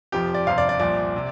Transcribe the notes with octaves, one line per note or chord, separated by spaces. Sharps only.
F1 F2 F3 G4
D5
G1 F2 C3 F5
D5
D5
C2 A#2 F3 D5
C3